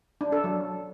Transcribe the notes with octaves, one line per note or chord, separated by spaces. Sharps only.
D4
A4
F#3